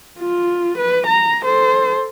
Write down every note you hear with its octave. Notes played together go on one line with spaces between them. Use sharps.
F4
B4
A#5
A4 C5